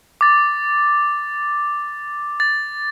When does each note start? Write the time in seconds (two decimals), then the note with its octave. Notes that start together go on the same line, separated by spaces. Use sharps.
0.21 D6 A6
2.40 A6